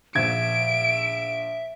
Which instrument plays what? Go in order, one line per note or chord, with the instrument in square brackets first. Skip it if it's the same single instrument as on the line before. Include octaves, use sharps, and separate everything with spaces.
[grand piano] A#1 G#6 [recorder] E5 [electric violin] D7